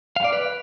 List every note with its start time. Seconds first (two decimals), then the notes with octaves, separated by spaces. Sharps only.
0.16 F5
0.24 D5
0.32 B4